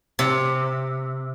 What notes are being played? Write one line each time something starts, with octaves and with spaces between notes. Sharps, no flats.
C3